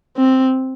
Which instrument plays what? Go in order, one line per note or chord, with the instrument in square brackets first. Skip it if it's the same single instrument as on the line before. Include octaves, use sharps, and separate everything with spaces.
[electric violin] C4